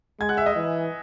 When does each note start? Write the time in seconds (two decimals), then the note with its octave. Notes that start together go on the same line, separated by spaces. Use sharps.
0.20 G#3 G#5 G#6
0.29 F#5 F#6
0.37 E5 E6
0.46 D#5 D#6
0.56 E3